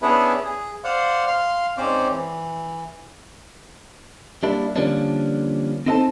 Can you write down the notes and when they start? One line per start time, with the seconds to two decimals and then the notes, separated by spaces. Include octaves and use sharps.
0.02 B3 C#4 D4 E4 G#4 B4
0.44 G#4
0.84 C5 D5 F5 F#5 C6
1.27 F5 C6 F6
1.78 G#2 C4 C#4 C5 D5 D6
2.11 E3
4.43 G3 A#3 D4 E4
4.76 D3 F3 G3 A#3 C#4 D4
5.86 C4 D#4 E4 A4 C5 A5